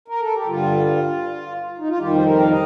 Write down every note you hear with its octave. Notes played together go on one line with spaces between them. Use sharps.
A#4
A4
G4
G2 D3 G3 F4
D#4
F4
F2 D#3 G3 G4
C5
A#4
F5
D#5